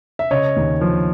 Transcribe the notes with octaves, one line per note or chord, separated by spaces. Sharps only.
E5
C#3 C#5 D#5
D#2
F3